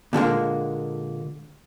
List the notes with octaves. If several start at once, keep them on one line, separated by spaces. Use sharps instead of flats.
A#2 D3 G#3 A#3